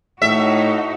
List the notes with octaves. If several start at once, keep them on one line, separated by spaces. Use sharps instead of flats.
A2 D#4 F#4 E5